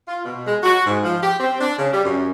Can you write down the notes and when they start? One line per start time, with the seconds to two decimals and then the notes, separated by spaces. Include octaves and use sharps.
0.08 F4
0.25 B2
0.47 G#3
0.63 F#4
0.85 G#2
1.04 F3
1.23 G4
1.40 C4
1.61 D4
1.79 C#3
1.92 G3
2.05 F#2